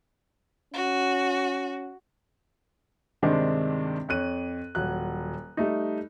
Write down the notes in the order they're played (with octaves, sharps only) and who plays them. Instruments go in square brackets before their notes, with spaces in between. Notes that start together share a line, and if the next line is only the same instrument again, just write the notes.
[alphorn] C#4 [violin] F#4
[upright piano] G2 C3 D#3 G#3 C4 D4
F2 C#5 F#6 D#7
D#1 F#3 F#6
G3 A3 D#4